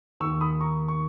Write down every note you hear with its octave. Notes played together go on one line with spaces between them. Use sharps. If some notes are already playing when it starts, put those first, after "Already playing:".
D#2 D#3 C#6 E6
B5 D#6
A#5 C#6
C#6